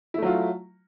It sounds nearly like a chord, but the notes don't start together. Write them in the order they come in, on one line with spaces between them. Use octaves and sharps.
E4 A3 F#3 F4